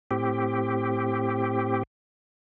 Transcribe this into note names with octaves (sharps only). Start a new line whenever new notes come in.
A2 C4 G4